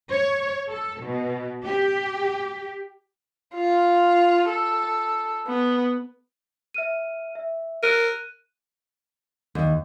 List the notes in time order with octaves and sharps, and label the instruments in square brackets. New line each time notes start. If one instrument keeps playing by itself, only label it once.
[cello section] C#5
A4
B2
G4
[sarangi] F4
A4
B3
[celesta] E5 F6 D#7
E5
[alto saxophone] A#4 [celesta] F#6 D#7
[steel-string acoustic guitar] D#2